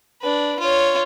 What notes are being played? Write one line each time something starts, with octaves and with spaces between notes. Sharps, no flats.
D4 B4
F4 C#5